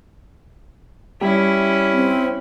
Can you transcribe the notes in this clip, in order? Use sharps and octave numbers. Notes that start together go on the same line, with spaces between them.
G3 C#4 E4
C4